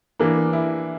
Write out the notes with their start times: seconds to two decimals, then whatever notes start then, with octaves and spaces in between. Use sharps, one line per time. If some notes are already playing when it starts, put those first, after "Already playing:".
0.19 E3 A#3 D4
0.53 E4